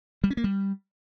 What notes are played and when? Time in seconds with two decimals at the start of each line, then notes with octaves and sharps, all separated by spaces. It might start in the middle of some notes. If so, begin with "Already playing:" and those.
0.24 G3
0.30 C#4
0.37 A#3
0.44 G3